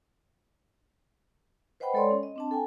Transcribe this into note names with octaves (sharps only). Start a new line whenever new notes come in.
B4 C5 D#5 F#5 G5 B5
G#3 A4 C#5 D5 C6
C#4
D#5
C4 D4 A5
A4 G5 G#5